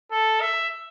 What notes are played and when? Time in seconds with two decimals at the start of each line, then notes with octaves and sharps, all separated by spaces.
0.11 A4
0.41 E5